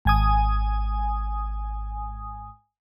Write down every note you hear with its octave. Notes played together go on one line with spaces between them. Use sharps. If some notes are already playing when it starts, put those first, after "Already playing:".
G#1 G#5 D#6